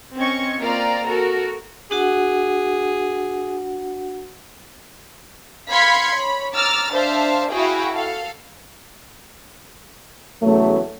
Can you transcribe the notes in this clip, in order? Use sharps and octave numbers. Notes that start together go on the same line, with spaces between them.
C4 C#4 D#5 C#6 G#6
A#3 C4 F4 D5 F5 A#5
F#4 A4 A#4
D4 F#4 G#4 F#5
F5 B5 C6 G#6 B6 C#7
C#5 B5
A#5 D6 E6 F6 A6
D4 C5 E5 F5 A5
E4 F#4 G#4 F5 G5
A4 F5
E2 C#3 F#3 A3